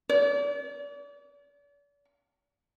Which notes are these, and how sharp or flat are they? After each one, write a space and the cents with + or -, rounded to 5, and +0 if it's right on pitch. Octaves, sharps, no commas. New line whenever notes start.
D5 -40